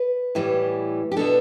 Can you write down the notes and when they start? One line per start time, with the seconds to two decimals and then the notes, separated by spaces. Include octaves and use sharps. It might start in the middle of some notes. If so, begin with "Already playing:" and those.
Already playing: B4
0.35 A2 E3 G3
1.12 G4
1.17 B2 B3 D4 A4